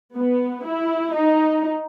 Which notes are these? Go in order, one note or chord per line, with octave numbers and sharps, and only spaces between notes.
B3
E4
D#4